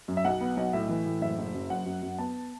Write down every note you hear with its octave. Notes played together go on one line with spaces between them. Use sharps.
F#2
E5
B1 F#5
B3
B1
A2 E5
E3
A2
F#1 E5
F#1
F#2
F#2 F#5
F#2
F#2
B3 A5